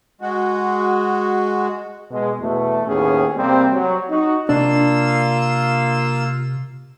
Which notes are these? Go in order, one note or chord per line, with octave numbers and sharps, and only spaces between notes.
G#3 F#4
B2 G#3
E2 B2 A3
D#2 A2 B3 C#4 G#4
C3 G3 A#3 C4
F#3
D#4 F#4
C3 A#3 D4 F4 E6